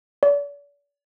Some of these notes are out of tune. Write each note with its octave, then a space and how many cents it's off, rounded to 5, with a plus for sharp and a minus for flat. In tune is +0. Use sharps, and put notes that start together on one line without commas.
D5 -40